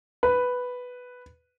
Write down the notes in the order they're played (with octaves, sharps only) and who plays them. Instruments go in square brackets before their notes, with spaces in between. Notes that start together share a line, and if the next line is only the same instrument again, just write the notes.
[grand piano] B4